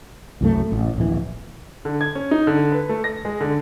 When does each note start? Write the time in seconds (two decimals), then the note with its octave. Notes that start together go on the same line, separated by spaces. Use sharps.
0.41 C2 F#2 A3
0.72 A1
0.98 D1 A#1 A#2 E3
1.85 D3
2.01 G#6
2.15 C#4
2.31 D#4
2.47 D3
2.72 B4
2.89 A3
3.04 A#6
3.25 G#3
3.40 D3